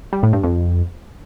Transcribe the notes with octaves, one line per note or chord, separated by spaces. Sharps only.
G3
A2
G2
F2